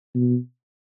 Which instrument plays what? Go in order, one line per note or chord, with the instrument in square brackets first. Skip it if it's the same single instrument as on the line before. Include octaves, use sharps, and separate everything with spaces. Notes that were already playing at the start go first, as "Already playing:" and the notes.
[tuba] B2